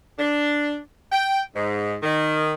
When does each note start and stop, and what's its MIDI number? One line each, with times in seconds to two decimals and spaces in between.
0.19 0.76 62
1.11 1.41 79
1.55 1.94 44
2.03 2.54 51